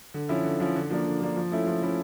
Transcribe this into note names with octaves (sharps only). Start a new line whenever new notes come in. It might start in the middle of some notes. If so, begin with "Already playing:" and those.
D3
F3 C#4 E4
D3
F3 C#4 E4
D3
F3 A#3 D4
D3
F3 A#3 D4
F3
A3 C#4 E4
F3
A3 C#4 E4